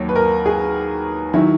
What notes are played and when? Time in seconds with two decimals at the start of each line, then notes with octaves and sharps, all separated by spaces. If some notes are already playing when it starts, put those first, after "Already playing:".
Already playing: D#2 D#3 F#3 C#5
0.09 B4
0.16 A#4
0.46 G#4
1.34 D#3 F#3 E4